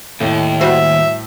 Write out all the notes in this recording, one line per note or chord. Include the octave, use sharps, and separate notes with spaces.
D#2 A2
G3 F#4 C5 E5